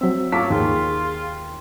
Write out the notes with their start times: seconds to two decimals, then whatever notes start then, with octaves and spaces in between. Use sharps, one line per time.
0.01 F#3 C4 E5
0.32 F#3 F4 C#5 F5 A5 D6 B6
0.50 D#2 F4 G#4